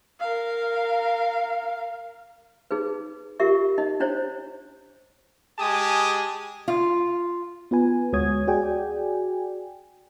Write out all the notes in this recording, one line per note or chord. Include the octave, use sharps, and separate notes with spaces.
A#4 F5
D#4 G#4 B4
F4 G4 A#4 E5 C#6
D#4 D#5
D4 E4 C5 C#5
G#3 G4 G#5 A5 D#6
F4
B3 F4 B4 G#5
D2 G#3 F#4 C#5 D#6 G#6
F#4 G#4 D5 G5 G#5